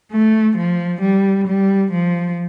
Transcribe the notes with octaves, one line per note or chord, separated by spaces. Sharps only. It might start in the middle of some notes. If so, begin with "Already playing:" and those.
A3
F3
G3
G3
F3